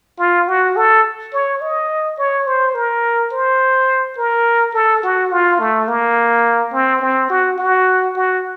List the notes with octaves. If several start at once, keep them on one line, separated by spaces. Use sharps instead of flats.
F4
F#4
A4
C#5
D#5
C#5
C5
A#4
C5
A#4
A4
F#4
F4
A3
A#3
C4
C4
F#4
F#4
F#4